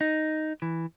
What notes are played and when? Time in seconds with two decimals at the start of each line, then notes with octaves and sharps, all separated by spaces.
0.01 D#4
0.62 E3